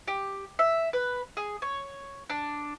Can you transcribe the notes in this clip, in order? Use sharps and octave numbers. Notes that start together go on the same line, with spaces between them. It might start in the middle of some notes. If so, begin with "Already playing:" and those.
G4
E5
B4
G#4
C#5
D4